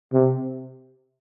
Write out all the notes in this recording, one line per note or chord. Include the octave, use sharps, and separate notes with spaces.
C3